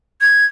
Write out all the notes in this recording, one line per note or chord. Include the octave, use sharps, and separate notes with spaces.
G#6